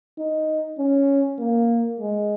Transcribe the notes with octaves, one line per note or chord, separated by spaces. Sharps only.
D#4
C#4
A#3
G#3